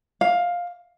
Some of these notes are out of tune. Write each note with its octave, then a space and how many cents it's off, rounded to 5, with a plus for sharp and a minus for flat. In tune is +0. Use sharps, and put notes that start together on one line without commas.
F5 +10